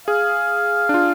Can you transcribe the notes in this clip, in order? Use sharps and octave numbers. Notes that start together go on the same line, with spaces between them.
G#4 F5
D4
F4